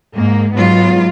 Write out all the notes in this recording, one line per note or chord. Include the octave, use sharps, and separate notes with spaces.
G#2 A#3
G#2 F#3 B3 F4